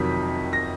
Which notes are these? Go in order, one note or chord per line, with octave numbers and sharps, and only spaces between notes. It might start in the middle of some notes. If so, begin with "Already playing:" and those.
Already playing: F2 C3 D#3 F#3 B6
A#6